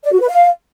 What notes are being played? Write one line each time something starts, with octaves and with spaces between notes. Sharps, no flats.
D5
F#4
B4
F5